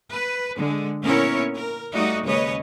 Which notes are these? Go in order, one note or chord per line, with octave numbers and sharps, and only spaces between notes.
B4
D3 G#3
A#2 B3 C#4 E4 A#4 C#5
A#4
G3 A3 D#4 F#4 D5 D#5
D#2 G#2 C#3 B4 C#5 D#5